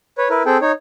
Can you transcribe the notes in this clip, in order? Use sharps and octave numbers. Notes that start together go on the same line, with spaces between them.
B4 C#5
E4 A#4 B4
C4 G#4 A4 G5
D#4 C#5